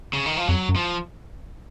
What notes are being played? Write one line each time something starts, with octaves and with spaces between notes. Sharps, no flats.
C#3
D#3
F3
F2 F#3
F#2
F3